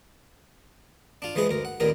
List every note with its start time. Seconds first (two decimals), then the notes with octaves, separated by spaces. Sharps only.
1.22 D4 F4
1.35 E3 F3 G#3 G#4 B4
1.49 D2 A#4
1.65 F#5
1.80 A1 D#2 A#2 D#3 A#4